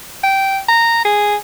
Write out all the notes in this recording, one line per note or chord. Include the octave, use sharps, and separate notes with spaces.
G5
A#5
G#4